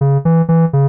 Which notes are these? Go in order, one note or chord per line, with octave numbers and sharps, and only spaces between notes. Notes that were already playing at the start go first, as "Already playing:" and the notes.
C#3
E3
E3
C#3